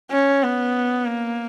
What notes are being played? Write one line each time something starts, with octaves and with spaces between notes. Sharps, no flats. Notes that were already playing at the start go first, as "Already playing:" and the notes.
C#4
B3
A#3